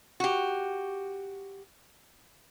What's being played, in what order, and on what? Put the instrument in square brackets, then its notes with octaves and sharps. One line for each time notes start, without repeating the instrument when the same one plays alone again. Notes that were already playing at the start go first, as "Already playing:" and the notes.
[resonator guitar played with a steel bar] F#4 G4